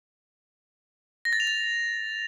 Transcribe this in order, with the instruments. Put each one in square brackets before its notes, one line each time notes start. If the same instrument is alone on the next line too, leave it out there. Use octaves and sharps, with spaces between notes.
[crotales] A#6
A6
F7
A6